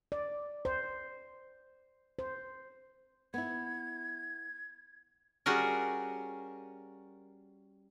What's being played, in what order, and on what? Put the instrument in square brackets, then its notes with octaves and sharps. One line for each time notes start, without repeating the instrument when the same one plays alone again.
[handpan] D5
C5
C5
[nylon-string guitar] B3 E4 [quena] G#6
[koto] G3 C#4 F#4 G#4 A#4